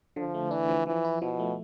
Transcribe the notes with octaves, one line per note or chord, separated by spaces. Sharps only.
D3 F3
A3
E3 D4
F3
E3 F3
E4
B2 F3
A3